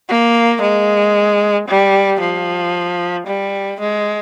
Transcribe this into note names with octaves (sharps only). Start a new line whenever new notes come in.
A#3
G#3
G3
F3
G3
G#3